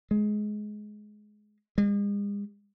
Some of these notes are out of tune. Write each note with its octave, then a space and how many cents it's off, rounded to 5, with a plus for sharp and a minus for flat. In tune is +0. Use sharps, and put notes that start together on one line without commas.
G#3 +15
G#3 -45